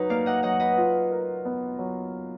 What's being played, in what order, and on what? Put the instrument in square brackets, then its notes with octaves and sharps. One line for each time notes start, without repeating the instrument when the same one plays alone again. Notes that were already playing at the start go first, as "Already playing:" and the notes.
Already playing: [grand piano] F#3 D#4 [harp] B4
[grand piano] A#3 [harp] D5 F5
[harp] D#5 F#5
[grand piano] F#3 [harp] D#5 F#5
[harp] B4 D#5
[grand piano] F4
A#4
B3
F#3